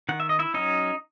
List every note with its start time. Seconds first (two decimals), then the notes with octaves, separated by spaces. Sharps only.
0.09 D#3 F#5
0.20 E5
0.29 D#5
0.39 E4 E5
0.54 F#3 C#4 D#4 D#5